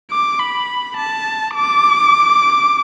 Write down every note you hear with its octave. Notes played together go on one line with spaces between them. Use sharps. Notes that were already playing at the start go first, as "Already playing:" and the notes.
D6
B5
A5
D6